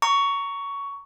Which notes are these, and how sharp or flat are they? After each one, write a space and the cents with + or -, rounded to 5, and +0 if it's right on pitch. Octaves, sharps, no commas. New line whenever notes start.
A#5 -10 C#6 +15